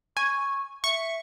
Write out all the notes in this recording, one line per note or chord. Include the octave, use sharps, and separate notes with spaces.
G#5 C#6
E5 C#6